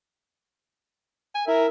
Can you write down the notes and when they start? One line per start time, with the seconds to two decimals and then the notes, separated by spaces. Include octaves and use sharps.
1.35 G#5
1.48 E4 A#4 E5